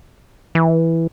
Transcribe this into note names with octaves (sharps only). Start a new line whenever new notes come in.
E3